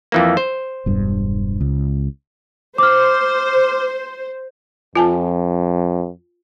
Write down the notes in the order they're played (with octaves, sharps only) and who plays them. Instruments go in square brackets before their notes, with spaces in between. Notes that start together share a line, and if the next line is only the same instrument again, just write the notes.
[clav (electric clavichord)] F2 E3 A#3
C5
[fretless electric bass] E1 G2
C#2
[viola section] C5 [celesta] D6 F6
[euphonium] F2 [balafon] F4 G#5 A5